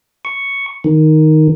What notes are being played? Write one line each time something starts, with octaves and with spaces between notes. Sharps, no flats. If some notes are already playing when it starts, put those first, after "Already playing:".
C#6
D#3